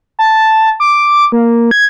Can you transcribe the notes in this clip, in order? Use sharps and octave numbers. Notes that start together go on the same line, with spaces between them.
A5
D6
A#3
G#6